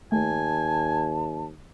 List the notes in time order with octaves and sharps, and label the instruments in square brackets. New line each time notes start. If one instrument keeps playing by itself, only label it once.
[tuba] D#2 [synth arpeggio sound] A3 [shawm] G#5 [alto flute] A5